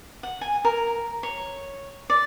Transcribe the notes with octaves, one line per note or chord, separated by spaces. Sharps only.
F#5
G#5
A#4
C#5
D5